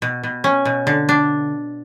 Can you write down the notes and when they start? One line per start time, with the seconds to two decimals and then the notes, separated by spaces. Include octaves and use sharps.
0.02 B2
0.23 B2
0.44 C#4
0.65 B2
0.87 D3
1.09 D4